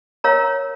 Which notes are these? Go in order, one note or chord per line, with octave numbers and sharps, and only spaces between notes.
A#4 C#5 F5 A#5